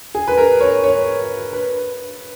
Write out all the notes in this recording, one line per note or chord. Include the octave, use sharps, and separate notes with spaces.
G#4
B4
A#4
C#5
C#5
B4